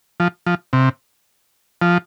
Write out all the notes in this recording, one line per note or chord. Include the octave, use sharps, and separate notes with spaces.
F3
F3
C3
F3